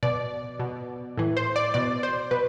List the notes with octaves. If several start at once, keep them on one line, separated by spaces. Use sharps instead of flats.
B2 D5
B2
A2 E3
C5
D5
B2 D5
C5
B2 B4